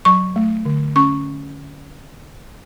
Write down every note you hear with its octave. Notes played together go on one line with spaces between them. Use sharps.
F#3 C#6
A3
D3
C#4 C#6